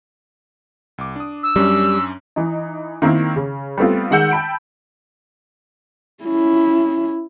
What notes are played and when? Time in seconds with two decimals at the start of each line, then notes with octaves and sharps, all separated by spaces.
0.98 C2 D6
1.16 D4 D#6
1.43 E6
1.56 F#2 G3 C#4 D4
2.36 E3 D#4
3.02 D#3 A#3 C4 E4
3.36 C#3
3.78 G3 A3 B3 C4 F4
4.11 D#3 G#3 F#5 E6 G6 C#7
4.31 G5 A5 B5 D7
6.24 C#4 E4